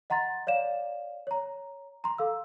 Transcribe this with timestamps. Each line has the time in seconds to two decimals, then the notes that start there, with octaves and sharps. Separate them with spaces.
0.10 D#5 F#5 A#5 C6 A6
0.47 C#5 D5 F5 E7
1.27 C#5 A#5
2.04 A#5 C6
2.18 A4 F5 E6